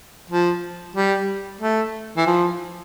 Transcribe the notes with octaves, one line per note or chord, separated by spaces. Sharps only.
F3
G3
A3
E3
F3